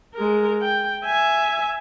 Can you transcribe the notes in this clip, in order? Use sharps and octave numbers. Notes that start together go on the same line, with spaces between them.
G#3 A#4
G5
E5 G#5